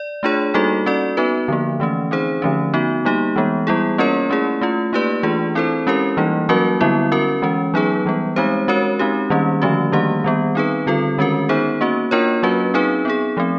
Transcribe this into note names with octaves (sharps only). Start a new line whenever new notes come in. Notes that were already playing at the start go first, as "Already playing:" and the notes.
Already playing: D5
A3 D4 F4 G#4 C#5
G3 A#3 D#4 F#4 A4
C#4 F#4 A4 D5
B3 D#4 F#4 B4
D3 F3 A#3
E3 A3 C#4
C4 D#4 G#4 C5
D3 F3 A3 C#4
B3 D#4 F#4
G3 A#3 D#4 G4
E3 G#3 B3
G3 B3 E4 G#4
A#3 C#4 F4 A#4 C#5
A3 C#4 E4 G#4
A3 C#4 F4
A#3 D#4 G4 B4 D5
E3 A3 D4 F4 G#4
C4 E4 A4 C5
G#3 C#4 E4 G4 A#4
E3 G3 A#3 D#4
F#3 A#3 C#4 F#4 A#4
D3 G3 B3 E4
C#4 F#4 A#4
E3 G#3 C#4
F#3 B3 D#4 G#4 B4
E3 G3 B3
G#3 C4 D#4 G4 C5
G#3 C#4 F#4 A#4 C#5
G#3 C4 D#4 G4
D#3 G3 A#3 C#4
D3 F3 A3 C#4 F#4
D#3 G3 A#3 D4 G4
D#3 G3 B3
C4 D#4 G#4 B4
D3 G3 C4 F4 A4
D#3 G#3 C#4 F#4 A#4
B3 D#4 G#4 C5
A#3 C#4 F#4
A#3 D4 F4 A#4 C#5
F#3 A#3 C#4 F#4 B4
C4 D#4 G#4 B4
B3 D#4 G#4
F3 A3 C4